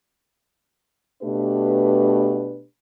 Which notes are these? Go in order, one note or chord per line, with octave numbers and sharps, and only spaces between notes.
B2 A3 D4 G4 B4